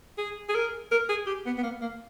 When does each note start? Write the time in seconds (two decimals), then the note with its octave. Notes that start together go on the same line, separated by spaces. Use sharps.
0.18 G#4
0.49 G#4
0.55 A#4
0.91 A#4
1.09 G#4
1.27 G4
1.46 B3
1.58 B3
1.63 A#3
1.81 A#3